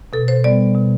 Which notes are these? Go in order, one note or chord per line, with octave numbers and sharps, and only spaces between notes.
B2 A4
C5
G3 B3 D5
B2